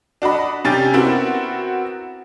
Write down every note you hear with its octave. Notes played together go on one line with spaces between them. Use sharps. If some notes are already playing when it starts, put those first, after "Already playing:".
D4 F#4 D#5 B5
C3 C#4 G4 A6
B3 C4 E4 F#4 A#4